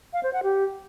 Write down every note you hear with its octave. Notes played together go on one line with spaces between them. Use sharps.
F5
C5
F#5
G4